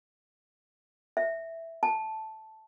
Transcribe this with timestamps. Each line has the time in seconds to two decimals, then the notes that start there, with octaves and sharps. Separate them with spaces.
1.17 E5
1.83 A5